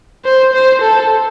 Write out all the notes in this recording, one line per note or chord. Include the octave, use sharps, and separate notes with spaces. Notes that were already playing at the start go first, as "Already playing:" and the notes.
C5
C5
A4